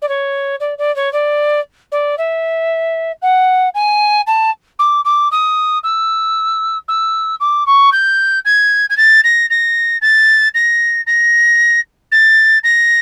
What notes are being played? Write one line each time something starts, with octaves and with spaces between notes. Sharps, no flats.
D5
C#5
D5
D5
C#5
D5
D5
E5
F#5
G#5
A5
D6
D6
D#6
E6
E6
D6
C#6
G6
G#6
G#6
A6
A#6
A#6
A6
A#6
A#6
A6
A#6